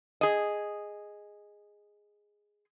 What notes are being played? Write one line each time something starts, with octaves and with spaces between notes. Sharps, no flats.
G#4 D#5